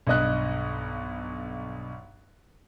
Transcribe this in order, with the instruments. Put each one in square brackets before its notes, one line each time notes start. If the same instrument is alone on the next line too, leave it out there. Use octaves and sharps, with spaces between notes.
[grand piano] B1 G2 D#5 F#6